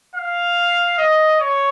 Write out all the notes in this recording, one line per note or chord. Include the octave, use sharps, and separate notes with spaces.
F5
D#5
C#5